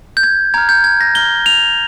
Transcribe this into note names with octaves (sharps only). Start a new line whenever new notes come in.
G6
G#6
A#5 F6 G#6
G6
G#6
A#6
A#5 F6 G7
F7